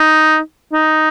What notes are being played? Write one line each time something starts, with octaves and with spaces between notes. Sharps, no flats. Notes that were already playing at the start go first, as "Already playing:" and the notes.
Already playing: D#4
D#4